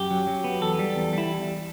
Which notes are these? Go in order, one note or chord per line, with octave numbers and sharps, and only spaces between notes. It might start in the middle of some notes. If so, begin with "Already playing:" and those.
Already playing: F#2 G4
F#3
F#3
B3
E2 A4
G3
E2
G3 E4